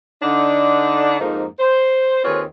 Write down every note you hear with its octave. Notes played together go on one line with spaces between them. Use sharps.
D3 D4 D#4
F2 G#2 F3 A#3 D#4
C5
D#2 C4 F4 G#4 B4 C#5